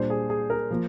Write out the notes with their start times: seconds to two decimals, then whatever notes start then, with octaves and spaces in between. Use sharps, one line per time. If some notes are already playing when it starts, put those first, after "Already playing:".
Already playing: A#2 G3 D4 C5
0.10 G#4
0.30 G#4
0.50 A#4
0.71 F3 A#3